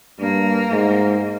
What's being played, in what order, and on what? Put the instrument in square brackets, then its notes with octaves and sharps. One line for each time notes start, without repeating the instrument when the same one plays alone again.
[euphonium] G2 [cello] A#3
[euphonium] G#2